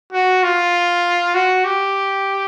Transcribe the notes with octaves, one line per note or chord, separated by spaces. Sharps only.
F#4
F4
F#4
G4